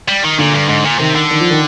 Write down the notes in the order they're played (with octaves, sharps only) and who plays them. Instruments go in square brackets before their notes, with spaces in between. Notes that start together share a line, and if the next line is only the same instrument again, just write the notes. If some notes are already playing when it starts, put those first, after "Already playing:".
[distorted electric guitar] G3
D#3
[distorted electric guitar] A#2 [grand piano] D3
[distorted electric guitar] G2
G#2
A#2
[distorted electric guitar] C3 [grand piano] D#3
[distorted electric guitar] D3
[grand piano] D#3
F3
D#3